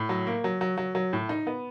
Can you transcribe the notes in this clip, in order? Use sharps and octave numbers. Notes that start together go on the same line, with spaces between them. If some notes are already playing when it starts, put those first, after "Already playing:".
Already playing: A2
F#3
A#3
F#3
F#3
F#3
F#3
A2
D#4
B3